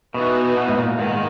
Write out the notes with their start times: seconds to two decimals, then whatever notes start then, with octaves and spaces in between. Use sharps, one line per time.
0.14 B2 E3 B3 D#4 F#4
0.57 B2
0.68 G#2
0.78 A#2
0.99 G#2 D#3 G#3